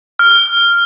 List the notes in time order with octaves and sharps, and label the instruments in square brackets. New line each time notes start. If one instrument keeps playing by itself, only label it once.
[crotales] F6